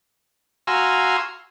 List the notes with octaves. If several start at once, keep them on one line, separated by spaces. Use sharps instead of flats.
F#4 F5 G#5 A#5 C6 E6